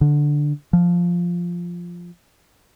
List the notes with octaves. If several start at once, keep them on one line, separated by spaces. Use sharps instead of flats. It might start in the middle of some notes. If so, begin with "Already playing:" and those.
D3
F3